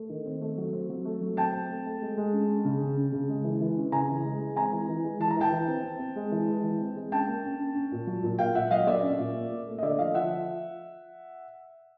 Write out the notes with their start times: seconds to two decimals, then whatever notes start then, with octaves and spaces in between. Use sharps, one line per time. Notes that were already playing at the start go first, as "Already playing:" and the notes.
Already playing: A3
0.09 D#3
0.26 C4
0.41 A3
0.58 F#3
0.73 C4
0.89 F#3
1.05 A3
1.21 F#3
1.37 C4 G5 A5
1.53 C4
1.69 A3
1.85 A3
2.02 G#3
2.17 G#3
2.33 C#4
2.49 C#4
2.65 C#3
2.81 C#4
2.97 C#4
3.12 C#3
3.29 G#3
3.44 E3
3.61 E3
3.77 C#4
3.92 C#3 G#5 A#5
4.08 E3
4.25 G#3
4.40 G#3
4.56 C4 G#5 A#5
4.72 E3
4.89 E3
5.04 G#3
5.20 E3 A5
5.31 A#5
5.36 E3 G5 A5
5.52 E3
5.67 C4
5.84 C4
5.99 C4
6.16 G#3
6.32 E3
6.48 G#3
6.64 E3
6.80 C4
6.96 G#3
7.12 C#4 G5 A5
7.27 A#3
7.44 C#4
7.59 C#4
7.75 C#4
7.91 A#2
8.07 F#3
8.23 A#2
8.39 A#3 F5 G5
8.54 A#2 E5 F#5
8.71 F#3 D#5 F5
8.87 A#3 D5 E5
9.02 C#4
9.19 A#2
9.34 A#3
9.51 A#3
9.67 A3
9.79 D#5
9.83 D3 D5 E5
9.98 F3 D#5 F5
10.14 F3 E5 F#5